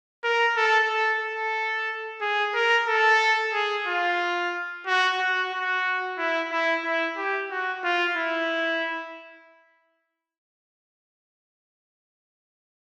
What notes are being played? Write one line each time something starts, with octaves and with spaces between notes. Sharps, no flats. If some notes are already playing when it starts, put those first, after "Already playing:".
A#4
A4
A4
A4
G#4
A#4
A4
G#4
F4
F#4
F#4
F#4
E4
E4
E4
G4
F#4
F4
E4